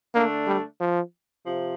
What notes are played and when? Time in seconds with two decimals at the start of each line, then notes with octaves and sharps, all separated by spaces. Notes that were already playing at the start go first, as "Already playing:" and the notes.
0.14 D3 A3 A#3 D4
0.47 G3
0.80 F3
1.46 C3 F3